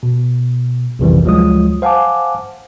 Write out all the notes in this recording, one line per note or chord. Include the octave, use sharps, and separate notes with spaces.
B2
A#1 F2 C3 D#3 E3 G3
D2 F3 F#3 G#3 F4 D#6
C5 F5 F#5 G#5 A5 D6